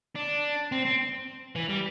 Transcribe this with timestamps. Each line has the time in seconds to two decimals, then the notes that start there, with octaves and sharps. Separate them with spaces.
0.16 D4
0.72 C4
0.85 C4
1.56 E3
1.69 G3